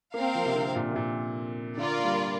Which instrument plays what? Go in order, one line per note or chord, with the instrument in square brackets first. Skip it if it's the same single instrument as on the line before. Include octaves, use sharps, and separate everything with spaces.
[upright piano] A#3 [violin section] C4 A#4 F5
[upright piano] F3
C3
D3
A#2
C3
A#2
[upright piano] D3 [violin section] F4 A#4 D5
[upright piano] A#3
G3